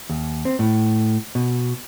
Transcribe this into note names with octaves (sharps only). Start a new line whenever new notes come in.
D#2
C4
A2
B2